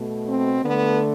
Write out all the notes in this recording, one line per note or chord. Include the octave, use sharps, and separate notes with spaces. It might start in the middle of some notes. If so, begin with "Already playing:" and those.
Already playing: B2 A3
C4
D3 A3 B3